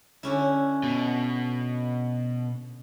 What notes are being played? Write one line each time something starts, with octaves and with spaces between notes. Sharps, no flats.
D3 C#4 E4
B2